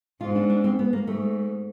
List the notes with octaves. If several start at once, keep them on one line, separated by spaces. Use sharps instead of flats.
G#2 F4
D4
D4
C4
B3
A#3
G#2 A3